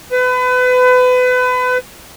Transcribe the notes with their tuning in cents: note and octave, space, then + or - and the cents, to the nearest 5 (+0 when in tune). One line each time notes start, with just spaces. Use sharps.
B4 +30